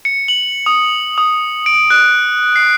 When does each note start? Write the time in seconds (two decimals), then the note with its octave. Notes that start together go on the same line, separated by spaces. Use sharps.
0.05 C#7
0.28 F#7
0.66 D#6
1.18 D#6
1.66 D7
1.90 F#6
2.56 C7